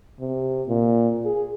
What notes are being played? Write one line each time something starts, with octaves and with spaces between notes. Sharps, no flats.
C3
A#2
G#4